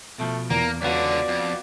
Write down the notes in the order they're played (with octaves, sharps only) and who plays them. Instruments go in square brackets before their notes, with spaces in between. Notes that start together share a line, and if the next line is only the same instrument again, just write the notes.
[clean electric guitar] B2 F3 [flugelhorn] A3
[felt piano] E2 [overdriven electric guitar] A#3 [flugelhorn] A#4
[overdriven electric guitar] C#2 D3 [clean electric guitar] B3 F4 F#4 [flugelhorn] D5
[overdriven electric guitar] F2